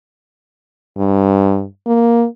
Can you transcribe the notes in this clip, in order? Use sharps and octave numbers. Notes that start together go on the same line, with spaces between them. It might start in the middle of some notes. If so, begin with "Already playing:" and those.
G2
A#3